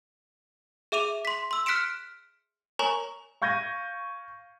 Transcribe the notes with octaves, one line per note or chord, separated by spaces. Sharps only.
G#4 E5 D6 D#7 F7
C6 B6
C6 E6
F6 F#6 B6 C#7 D7 E7
A#4 C#5 G#5 A#5 C#6 F#7
F5 C#6 G6 G#6 A#6 D#7